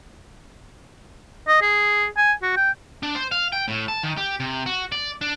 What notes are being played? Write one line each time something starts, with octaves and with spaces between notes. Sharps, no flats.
D#5
G#4
G#5
F#4
G5
D4
C5
F5
G5
A2
A5
D#3
G4
C3
F#4
D5
D4